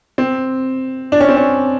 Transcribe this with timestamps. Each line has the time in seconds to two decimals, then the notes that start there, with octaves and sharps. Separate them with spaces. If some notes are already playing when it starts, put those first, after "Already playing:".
0.18 C4
1.12 D4
1.20 C#4
1.29 C4
1.37 C#4